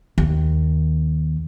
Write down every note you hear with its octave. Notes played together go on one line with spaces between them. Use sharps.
D#2